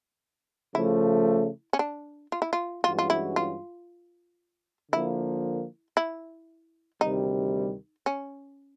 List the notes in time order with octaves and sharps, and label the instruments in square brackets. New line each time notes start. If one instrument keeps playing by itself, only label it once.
[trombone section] C#3 F3 A3 [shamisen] E4
[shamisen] C#4
D4
F4
E4
F4
[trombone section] G2 E3 G#3 C#4 F#4 [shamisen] F4
[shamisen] F4
E4
F4
[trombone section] D3 F3 A#3 [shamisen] E4
[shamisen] E4
[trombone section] D2 C3 D#3 G3 [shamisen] D#4
[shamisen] C#4